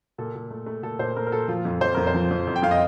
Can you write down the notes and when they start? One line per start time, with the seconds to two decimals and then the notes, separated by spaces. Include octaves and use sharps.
0.18 A#2 A4
0.35 A#2
0.51 A3
0.66 A3
0.83 A#2 A4
0.99 A#2 C5
1.16 A3 A#4
1.27 A#4
1.32 A#2 A4
1.48 F3 F4
1.65 F2
1.81 F2 C5
1.95 F2 A#4
2.07 C5
2.14 F3
2.31 F2
2.47 F2
2.56 G5
2.62 F2 F5
2.71 D#5